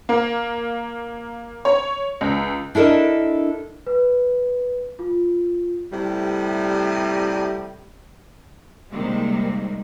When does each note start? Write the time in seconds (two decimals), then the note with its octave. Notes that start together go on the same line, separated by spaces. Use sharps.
0.09 A#3
1.65 C#5
2.21 C#2
2.75 D4 E4 A4 A#4 D#5
3.86 B4
4.99 F4
5.93 A2 C3 G3
8.91 C3 D#3 G3 G#3 A#3